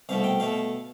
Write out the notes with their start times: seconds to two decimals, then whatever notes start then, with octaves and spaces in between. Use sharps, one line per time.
0.09 C2 B2 A3 F5
0.24 G5
0.40 B2 A3 F5